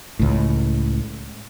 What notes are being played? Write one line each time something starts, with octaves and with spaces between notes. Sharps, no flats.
C#2 A2